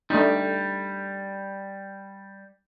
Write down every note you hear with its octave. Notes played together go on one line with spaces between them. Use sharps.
G3 A3 D4 D#4